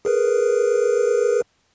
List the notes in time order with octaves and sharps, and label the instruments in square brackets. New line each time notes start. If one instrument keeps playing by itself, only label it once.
[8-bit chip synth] G#4 A#4 B4